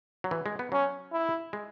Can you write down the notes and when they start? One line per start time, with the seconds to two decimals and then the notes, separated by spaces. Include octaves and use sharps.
0.24 F#3
0.31 E3
0.46 G#3
0.59 B3
0.72 F#3 C#4
1.12 E4
1.53 G#3